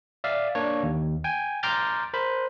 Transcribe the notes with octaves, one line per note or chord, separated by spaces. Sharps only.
D5 E5 F5
A#3 D4 C#5
D#2
G5 G#5
A#5 C6 D6 F6 G6 A6
A#4 C5 B5